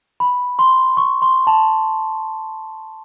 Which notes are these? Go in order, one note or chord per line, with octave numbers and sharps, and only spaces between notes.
B5
C6
C#6
C6
A5